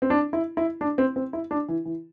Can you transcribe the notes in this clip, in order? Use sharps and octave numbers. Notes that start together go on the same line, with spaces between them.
C4
D4
E4
E4
D4
C4
C4
E4
D4
E3
E3